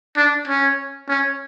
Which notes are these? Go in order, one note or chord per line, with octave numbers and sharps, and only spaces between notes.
D4
C#4
C#4